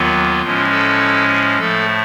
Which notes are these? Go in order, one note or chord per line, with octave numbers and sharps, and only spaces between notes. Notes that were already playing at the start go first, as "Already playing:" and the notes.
Already playing: D#2 D#3 F#3 B3 F4
A2 F3 G#3 C#4
A4
A2 F3 A3 A4